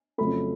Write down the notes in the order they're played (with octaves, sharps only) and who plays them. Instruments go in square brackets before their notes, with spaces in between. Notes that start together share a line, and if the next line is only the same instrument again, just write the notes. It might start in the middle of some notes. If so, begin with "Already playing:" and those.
[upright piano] F2 C#3 F#3 A3 B5